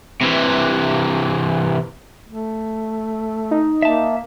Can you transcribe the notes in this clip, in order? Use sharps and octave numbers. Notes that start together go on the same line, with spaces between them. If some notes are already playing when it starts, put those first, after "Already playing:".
C3 E3
A3
D#4
A#3 E5 A5